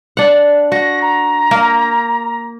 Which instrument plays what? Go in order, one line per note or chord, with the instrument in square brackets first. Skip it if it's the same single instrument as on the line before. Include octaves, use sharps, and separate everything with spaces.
[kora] D4 F#5
[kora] F#4 [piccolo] A#6
[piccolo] A#5
[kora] A#3 A#4